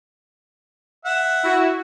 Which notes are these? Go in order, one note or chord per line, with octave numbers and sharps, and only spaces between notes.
E5 F#5
E4 F#4